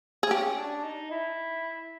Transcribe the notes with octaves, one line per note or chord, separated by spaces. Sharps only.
G#4
C#4 G4
D4
D#4
E4